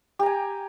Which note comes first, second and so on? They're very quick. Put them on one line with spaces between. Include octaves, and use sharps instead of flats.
G4 A#5 G#5